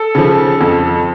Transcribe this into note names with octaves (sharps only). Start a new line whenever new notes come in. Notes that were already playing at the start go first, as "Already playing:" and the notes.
Already playing: A4
C#3 F3
F2